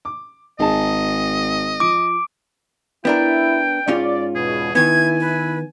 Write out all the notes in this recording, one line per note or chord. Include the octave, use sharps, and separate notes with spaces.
D6
G#1 D#4 G#4 D#5 A5
F3 D6 D7
B3 D4 E4 A#4 G5
G#2 C#4 F4 D5
E2 B2 G#4
D#3 B3 E4 G#5 G#6
B4